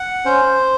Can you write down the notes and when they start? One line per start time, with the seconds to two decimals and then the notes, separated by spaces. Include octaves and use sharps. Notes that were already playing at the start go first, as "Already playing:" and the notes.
Already playing: F#5
0.25 C#4 C5